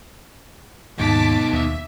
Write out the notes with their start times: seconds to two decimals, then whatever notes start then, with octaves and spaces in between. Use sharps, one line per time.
0.98 D#2 G#2 B2 D#4 A5 D6 B6
1.53 D#2 E5